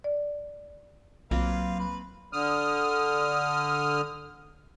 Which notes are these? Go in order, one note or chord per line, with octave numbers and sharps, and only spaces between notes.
D5
B1 F#3 A#3 C4 F4 B4 F5
B4 B5
D3 D#6 F6